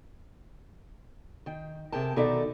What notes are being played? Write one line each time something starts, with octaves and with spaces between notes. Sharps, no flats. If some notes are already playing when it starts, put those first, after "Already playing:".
D#3 G5
C3 G#4 A#4 G5 A5
B2 D#3 D#4 A4 D5 E5